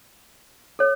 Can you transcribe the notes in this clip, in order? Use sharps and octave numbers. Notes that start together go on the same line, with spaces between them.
A4 C#5